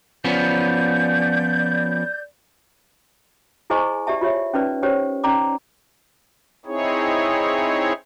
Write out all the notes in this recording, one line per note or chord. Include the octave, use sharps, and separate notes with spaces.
F3 B3 C#4 D5 G6
E4 G#4 C5 D#5 G#5 C#6
G4 D5 E5 A5
F4 G4 C#5 E5
C#4 D#4 B4 D5
C#4 G4 C5 C#5
C#4 D#4 D5 A#5 D6
C4 D#4 E4 G#4 C#5